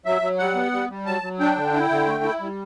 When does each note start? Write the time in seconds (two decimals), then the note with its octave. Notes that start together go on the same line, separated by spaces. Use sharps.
0.05 F#3 E5
0.22 F#3
0.38 G3 F#5
0.55 B3
0.72 G3
0.90 G3
1.06 F#3 A5
1.22 F#3
1.39 D4 G5
1.56 D3
1.73 E4
1.90 D3
2.06 A3
2.24 E4
2.40 G3